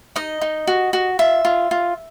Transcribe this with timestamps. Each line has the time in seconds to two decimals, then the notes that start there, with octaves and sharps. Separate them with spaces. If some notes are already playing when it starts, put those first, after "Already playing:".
0.16 D#4 D#5
0.41 D#4
0.67 F#4
0.93 F#4
1.19 F4 E5
1.45 F4
1.71 F4